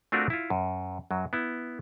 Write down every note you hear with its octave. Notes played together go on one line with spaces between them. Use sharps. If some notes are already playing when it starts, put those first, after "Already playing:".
A3 C4 D4 F4 F#4 A#4
E4 F4
F#2
F#2 F#3
B3 E4